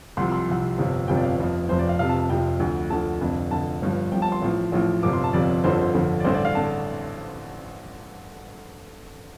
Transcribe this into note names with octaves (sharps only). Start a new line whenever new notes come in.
C2 C3 F3 C6
C6
C2 C3 F3
G1 F2 C3 F3
G1 F2 C3 F3 G5
D5
F5
F1 F2 F3
F1 F2 F3 C5
D5
F5
F1 F2 C3 F3 F5
A5
A5
F1 F2 C3 F3 G5
D2 D3 F3
D2 D3 F3 A5
F1 F2 D3
F1 F2 D3 A5
G1 G2 F3
G1 G2 F3 G5
A5
C6
A1 A2 F3
A1 A2 F3
G1 F2 C3 F3 D6
C6
A5
G1 F2 C3 F3 D5
G1 F2 D3 F3 C5
A4
C5
G1 F2 D3 F3
D5
A1 G2 D3 C5
D5
F5
D3 A5